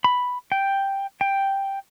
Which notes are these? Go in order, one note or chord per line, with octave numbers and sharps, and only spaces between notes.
B5
G5
G5